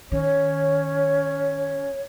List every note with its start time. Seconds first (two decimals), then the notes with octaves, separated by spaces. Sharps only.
0.12 D#3 C#4 C#5